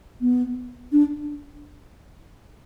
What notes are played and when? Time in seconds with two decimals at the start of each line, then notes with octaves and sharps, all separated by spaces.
0.21 B3
0.92 D4